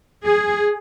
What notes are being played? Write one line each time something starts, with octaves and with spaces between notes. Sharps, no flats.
G#4